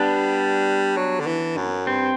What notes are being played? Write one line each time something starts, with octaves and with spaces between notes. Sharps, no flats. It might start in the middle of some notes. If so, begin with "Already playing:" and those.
Already playing: G3 B3 D4
F#3
D3
E3
F#2
G2 C4